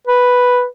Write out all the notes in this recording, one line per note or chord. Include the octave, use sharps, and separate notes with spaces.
B4